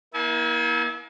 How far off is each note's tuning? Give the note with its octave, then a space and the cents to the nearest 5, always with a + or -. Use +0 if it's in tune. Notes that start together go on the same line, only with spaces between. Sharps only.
A#3 +35 E4 -25 G#5 +40